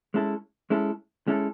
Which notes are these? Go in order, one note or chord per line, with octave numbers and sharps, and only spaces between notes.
G#3 C#4 E4 A4
G#3 C#4 E4 A4
G#3 C#4 E4 A4